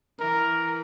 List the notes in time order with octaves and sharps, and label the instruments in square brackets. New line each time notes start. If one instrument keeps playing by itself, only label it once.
[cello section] E3 [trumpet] A#4